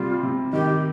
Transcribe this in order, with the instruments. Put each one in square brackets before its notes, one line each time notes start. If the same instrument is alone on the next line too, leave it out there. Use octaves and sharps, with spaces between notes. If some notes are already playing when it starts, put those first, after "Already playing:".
Already playing: [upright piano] C3 G3 [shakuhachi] F4
[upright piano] C3
[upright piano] D#3 [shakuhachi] G4